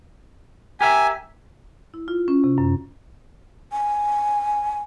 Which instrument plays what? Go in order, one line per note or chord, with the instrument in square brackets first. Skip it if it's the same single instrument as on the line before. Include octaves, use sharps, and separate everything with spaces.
[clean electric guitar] G4 A#4 E5 [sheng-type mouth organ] G#5
[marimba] E4
F4
C#4
C3
F#2
[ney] G#5